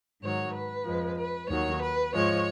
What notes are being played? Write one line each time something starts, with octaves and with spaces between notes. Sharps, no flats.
G#2 D#3 F#3 C#5
B4
F2 F3 G#3
B4
D#2 D#3 F#3 C#5
B4
G#2 F3 G#3 C#5